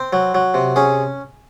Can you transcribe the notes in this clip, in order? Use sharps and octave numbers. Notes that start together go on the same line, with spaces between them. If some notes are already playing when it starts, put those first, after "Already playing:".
Already playing: C4
F#3
F#3
C3
C#4 G#4